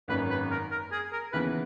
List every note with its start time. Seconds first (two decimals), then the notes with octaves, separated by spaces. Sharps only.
0.08 G#1 F#2 D#3 A#3 C#4 B4
0.30 B4
0.51 A#4
0.71 A#4
0.91 G#4
1.12 A#4
1.32 D#2 C#3 E3 B3 B4